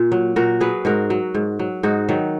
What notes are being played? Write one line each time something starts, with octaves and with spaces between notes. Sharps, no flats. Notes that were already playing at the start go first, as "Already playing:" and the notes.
Already playing: A#2
F#3
A#2 F#4 A#4
F#3 G#4 B4
G#2 F#4 A#4
F#3
G#2
F#3
G#2 D#4 F#4
D#3 F#3